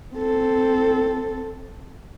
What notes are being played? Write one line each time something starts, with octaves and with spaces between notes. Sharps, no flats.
C4 A4